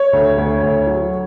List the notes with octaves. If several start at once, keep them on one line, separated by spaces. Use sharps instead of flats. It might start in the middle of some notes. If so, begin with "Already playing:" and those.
Already playing: C#5
D2
D2
D2
F#3